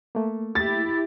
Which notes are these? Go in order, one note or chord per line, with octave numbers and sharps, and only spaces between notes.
A3 A#3
E4 G4 A6